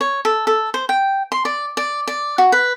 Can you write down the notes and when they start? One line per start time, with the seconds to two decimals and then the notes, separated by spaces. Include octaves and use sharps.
0.01 C#5
0.25 A4
0.47 A4
0.74 C5
0.89 G5
1.32 C6
1.45 D5
1.77 D5
2.07 D5
2.38 F#4
2.52 B4